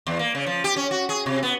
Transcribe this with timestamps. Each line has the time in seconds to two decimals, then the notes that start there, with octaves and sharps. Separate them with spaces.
0.07 E2
0.19 A#3
0.35 C#3
0.46 F3
0.64 G4
0.76 C#4
0.91 F#4
1.09 G#4
1.26 C3
1.43 B3